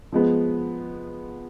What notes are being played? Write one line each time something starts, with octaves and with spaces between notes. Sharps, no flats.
F3 G#3 B3